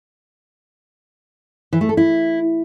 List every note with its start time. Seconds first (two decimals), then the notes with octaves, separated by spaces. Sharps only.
1.73 E3
1.81 A3
1.89 A4
1.97 E4